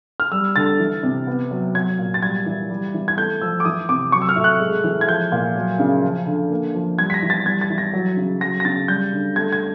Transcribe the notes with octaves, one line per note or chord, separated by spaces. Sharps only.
F6
G3 E6
D3 A6
E3
C3
B3
F#3
F#3 G#6
A#2
A6
G3 G#6
E3
G3
E3
G#6
A3 G6
F3 E6
D6
E3 D#6
C3 D6
F#3 C#6
E6
F6
A2
F#6
G#3
E3
G#6
F3 G6
A#2
F#3
C#3
F3
D3
A#3
F3
G3 G#6
B6
A#6
E3
A6
G3 G#6
A6
E3
A#6
F#3
C#3
F#3 A#6
A#6
C#3 A6
G3 G6
D3
A3 G#6
G#6